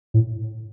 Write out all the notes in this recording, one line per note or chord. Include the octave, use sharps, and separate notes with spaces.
A2